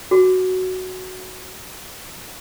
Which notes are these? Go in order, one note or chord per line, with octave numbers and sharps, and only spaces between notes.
F#4 D6